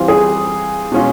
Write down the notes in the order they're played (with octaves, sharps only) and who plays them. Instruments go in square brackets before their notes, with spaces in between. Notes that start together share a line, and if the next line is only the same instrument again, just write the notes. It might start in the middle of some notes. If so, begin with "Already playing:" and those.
Already playing: [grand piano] E3 G3 C4 F4
[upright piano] G#4
[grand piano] B2 G#3 C#4 F4